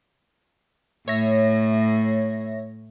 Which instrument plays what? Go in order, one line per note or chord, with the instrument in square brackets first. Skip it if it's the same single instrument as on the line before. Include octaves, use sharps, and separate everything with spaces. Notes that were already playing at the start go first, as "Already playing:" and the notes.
[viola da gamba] A2 [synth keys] C#5 E5 A#6